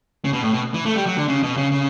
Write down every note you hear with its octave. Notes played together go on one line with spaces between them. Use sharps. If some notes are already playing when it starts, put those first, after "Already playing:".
C#3
B2
A2
B2
E3
A3
G3
F#3
D3
C#3
B2
C#3
C#3